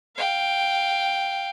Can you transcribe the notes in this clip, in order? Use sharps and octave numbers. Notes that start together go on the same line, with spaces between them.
F5 G5